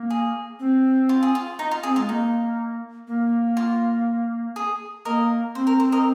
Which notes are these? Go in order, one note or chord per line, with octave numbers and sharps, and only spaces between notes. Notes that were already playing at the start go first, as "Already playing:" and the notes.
Already playing: A#3
G#4
C4
F4
G#4
F4
D#4
F4
C4 G#4
G#3 F4
A#3 D#4
A#3
F4
G#4
A#3 A#4 D#5
C4 C5
A#4
C5
A#4 D#5